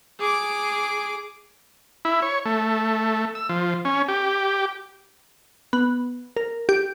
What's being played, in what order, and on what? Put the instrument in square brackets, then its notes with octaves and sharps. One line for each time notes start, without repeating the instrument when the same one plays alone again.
[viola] G#4 D6
[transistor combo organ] E4
C#5
A3
E6
F3
C#4
G4
[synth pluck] B3
A#4
G4